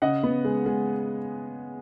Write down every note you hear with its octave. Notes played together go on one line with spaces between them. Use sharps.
C#3 D#5 F#5
B3
G#3
G#3